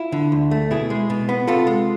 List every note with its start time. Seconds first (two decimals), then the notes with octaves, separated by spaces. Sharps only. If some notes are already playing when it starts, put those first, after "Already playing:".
Already playing: E4 F4
0.12 D3
0.32 D2
0.51 A3
0.71 B2 E4 G#4
0.90 G#3
1.10 B2
1.29 B3
1.47 C3 F4 A4
1.67 G#3